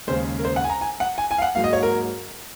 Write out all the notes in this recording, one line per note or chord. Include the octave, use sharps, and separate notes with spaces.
D#2 C#3 G#3 C5
A#4
C5
F#5
G#5
A#5
G#5
F#5
G#5
G#5
F5
F#5
G#2 F#3 A#3 F5
D#5
C#5
A#4